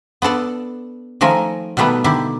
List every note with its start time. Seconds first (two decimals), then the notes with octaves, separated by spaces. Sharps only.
0.22 B3 D4 A4 D5
1.21 D#3 F3 A3 A#4 G#5
1.77 B2 D#3 G3 A3 B3
2.04 D3 D#3 E4 G4